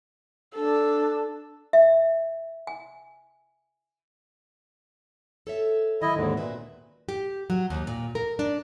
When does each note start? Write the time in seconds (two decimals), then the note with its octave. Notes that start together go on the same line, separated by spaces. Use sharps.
0.55 D4 A4
1.73 E5
2.67 G#5
5.47 A4 C#5 E5
6.02 D#3 E3 F#3 E4 D#5
6.16 D#2 G#2 D3
6.37 A#2 F#4 B4 E5
7.09 G4
7.50 F#3
7.70 D#2
7.87 A#2
8.15 A#4
8.39 D4